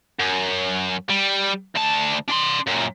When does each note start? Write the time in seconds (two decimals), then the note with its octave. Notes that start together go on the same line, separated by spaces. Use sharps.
0.19 F#2
1.09 G3
1.75 D2 A5
2.28 D4 C6
2.67 F#2 A#2